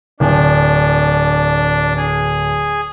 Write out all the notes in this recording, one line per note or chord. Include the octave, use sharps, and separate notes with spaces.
D1 D4
G#4